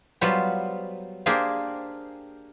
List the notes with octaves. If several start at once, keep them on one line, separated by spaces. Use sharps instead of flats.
F#3 G3 B3 F4 C5 B5
A#3 D4 G4 G#4 A#4 C5